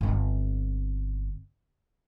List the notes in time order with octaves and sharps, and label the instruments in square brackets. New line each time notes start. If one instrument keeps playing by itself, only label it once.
[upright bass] G1 C4